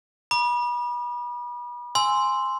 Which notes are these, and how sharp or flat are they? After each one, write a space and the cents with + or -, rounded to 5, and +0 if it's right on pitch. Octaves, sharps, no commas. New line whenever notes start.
B5 -35 D6 +45
G#5 +0 C6 +0 E6 +0